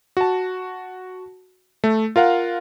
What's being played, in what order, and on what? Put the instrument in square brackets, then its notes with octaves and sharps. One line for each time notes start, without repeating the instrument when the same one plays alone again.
[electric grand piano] F#4 A5
A3
F4 A#4 F5 F#5